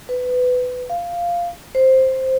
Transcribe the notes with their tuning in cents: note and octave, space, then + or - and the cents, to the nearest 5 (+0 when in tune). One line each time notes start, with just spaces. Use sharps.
B4 +20
F5 -5
C5 +5